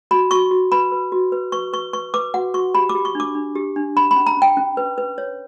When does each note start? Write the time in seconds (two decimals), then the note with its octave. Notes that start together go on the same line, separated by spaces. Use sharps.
0.11 F#4 B5
0.31 F#4 C#6
0.51 F#4
0.72 B4 B5
0.92 B4
1.12 F#4
1.32 B4
1.52 B4 C#6
1.73 B4 C#6
1.93 B4 C#6
2.14 B4 D6
2.34 F#4 F#5
2.54 F#4 C#6
2.75 G4 B5
2.89 D6
2.95 G4
3.05 C#6
3.15 D4 D6
3.35 D4
3.55 G4
3.76 D4
3.96 C#4 B5
4.11 B5
4.16 C#4
4.27 A#5
4.37 C#4
4.42 G5
4.57 C#4
4.77 B4
4.98 B4
5.18 C#5